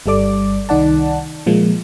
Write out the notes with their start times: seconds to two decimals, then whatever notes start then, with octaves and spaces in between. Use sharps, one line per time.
0.06 G1 G3 A4 D5 D6
0.69 C2 D#3 D#4 D5 F#5 A5
1.46 A#2 F3 G#3 A#3